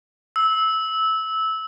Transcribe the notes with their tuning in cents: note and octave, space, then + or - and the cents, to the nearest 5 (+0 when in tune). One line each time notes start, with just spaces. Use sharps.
E6 -15